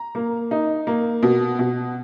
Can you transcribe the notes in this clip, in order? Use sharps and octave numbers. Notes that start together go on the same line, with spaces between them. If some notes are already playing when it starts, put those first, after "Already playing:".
Already playing: A#5
A#3
D#4
A#3
B2
B2